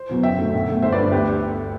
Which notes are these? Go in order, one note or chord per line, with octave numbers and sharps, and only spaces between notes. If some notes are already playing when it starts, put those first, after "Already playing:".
Already playing: C5
E2 B2 F#3 B3
F#2 E5 G5
D3 A3
B1
B2 A3
G1 C5 E5
B4 D5
G2 D3
D2 G4 B4